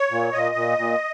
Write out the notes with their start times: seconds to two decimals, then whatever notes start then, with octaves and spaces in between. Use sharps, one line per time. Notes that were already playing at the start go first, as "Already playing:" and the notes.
Already playing: C#5
0.11 A#2
0.33 A#2 D#5
0.55 A#2
0.78 A#2